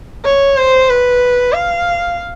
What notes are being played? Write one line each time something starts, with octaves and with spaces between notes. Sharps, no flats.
C#5
C5
B4
F5